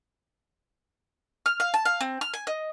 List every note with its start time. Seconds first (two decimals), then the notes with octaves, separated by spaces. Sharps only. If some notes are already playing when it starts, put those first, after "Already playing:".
1.46 F6
1.60 F5
1.74 A5
1.85 F5
2.01 C4
2.21 F6
2.34 G#5
2.47 D#5